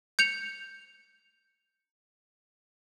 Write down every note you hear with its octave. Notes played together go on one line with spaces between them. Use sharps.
G6 C#7 F7